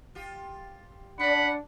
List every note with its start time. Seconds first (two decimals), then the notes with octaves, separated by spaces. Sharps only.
0.15 F4 G4
1.19 C#4 D4 D5 F#5 B5